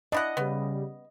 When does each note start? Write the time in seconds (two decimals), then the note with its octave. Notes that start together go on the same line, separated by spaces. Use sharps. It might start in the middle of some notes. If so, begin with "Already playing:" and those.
0.12 D4 E4 D#5 F#5
0.37 C#3 G3 B3